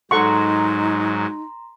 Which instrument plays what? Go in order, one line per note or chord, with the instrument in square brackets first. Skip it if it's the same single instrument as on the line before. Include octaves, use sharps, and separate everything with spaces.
[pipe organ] G#2 F#3 [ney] D#4 [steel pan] A4 F#5 C#6 [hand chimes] A#5 C6